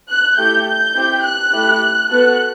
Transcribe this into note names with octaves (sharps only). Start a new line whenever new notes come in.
F#6
A3 E4 G4 G6
G6
C4 E4 G4
F#6
A3 E4 G4
B3 F#4 A4 F#6